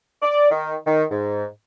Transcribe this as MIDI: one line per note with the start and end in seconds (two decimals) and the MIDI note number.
0.22 0.49 74
0.51 0.75 51
0.86 1.04 51
1.11 1.45 44